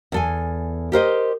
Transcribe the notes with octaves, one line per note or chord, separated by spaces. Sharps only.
E2 A4 G#5
G4 A#4 C5 D#5